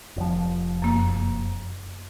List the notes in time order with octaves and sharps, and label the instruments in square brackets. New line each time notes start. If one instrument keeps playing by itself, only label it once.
[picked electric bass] F1 F3
[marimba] F#2 A#3